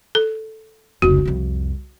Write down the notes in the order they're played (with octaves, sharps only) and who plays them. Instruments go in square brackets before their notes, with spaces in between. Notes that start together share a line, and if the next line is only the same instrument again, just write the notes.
[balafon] A4
[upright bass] F1 C#2 [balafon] F#4
[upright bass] C2 F2